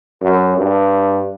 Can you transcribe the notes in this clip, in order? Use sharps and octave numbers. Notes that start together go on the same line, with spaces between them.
F#2
G2